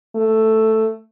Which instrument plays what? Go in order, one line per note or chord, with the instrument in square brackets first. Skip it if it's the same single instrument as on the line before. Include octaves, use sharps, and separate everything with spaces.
[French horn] A3